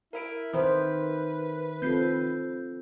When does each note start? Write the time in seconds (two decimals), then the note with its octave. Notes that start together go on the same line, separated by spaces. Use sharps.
0.13 E4 A#4 E5 D7
0.53 D#3 D#4 B4 C5
1.82 C4 F4 A4 G6 C7